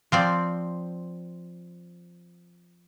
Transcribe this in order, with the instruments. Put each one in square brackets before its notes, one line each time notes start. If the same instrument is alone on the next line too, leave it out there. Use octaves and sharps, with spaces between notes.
[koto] F3 C4 D5